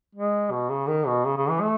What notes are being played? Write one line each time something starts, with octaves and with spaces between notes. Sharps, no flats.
G#3
B2
C#3
D#3
B2
C#3
C#3
E3
A3